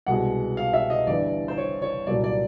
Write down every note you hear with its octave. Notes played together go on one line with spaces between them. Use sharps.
C2 B2 G#3 F#5
F5
E5
D#5
G1 G2 E3 D5
C5
C#5
C#5
C2 A#2 F#3 D5
D5